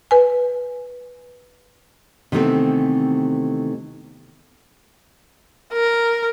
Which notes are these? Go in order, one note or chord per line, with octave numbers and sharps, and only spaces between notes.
B4 G#5
C3 D#3 E3 A3 B3 C4
A#4